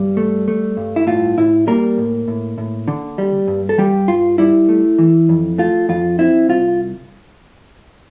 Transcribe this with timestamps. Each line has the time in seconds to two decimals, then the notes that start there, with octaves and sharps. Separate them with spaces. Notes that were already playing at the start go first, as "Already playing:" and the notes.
Already playing: G2 G3
0.17 A3
0.48 A3
0.77 G2
0.96 E4
1.07 A2 F4
1.38 A2 E4
1.67 G3 A#3 A#4
1.98 A2
2.28 A2
2.58 A2
2.88 D3
3.18 G3
3.48 G2
3.69 A4
3.78 G2 G3 G4
4.08 G2 F4
4.38 G3 E4
4.69 A3
4.98 E3
5.29 F2
5.58 A3 F4
5.89 F2 F4
6.19 C4 E4
6.49 C2 F4